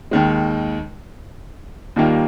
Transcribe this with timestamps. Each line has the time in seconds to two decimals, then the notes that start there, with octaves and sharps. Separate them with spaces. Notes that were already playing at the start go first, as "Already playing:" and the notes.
0.11 D#2 D#3 G#3
1.96 D#2 D#3 G3 A#3 F4